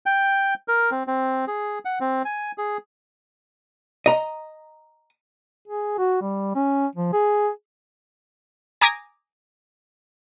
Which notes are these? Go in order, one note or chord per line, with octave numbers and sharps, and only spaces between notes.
G5
A#4
C4
C4
G#4
F#5
C4
G#5
G#4
D#5 A#5
G#4
F#4
G3
C#4
F3
G#4
G#5 A#5 D6 D#6 G#6 A#6